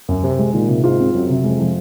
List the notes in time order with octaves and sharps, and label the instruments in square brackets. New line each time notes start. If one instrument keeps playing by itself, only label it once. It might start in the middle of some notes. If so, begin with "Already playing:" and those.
[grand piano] F#2
[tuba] C3 [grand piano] C4
[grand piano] G#3
[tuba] A#2 [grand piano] D#3
[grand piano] C3
[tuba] G#2 [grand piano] F4
[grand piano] C4
[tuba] F#2 [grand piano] F#3
[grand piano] C3
[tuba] F2 [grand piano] G#3
[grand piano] F3